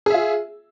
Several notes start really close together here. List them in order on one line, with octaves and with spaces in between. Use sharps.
G#4 E5 F4